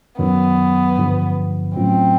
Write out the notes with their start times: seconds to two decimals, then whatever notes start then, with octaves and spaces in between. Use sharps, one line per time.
0.19 F#2 D#3 F#3 B3
0.98 G2 D3 F3
1.76 A2 F#3 A3 C4 C#4 F4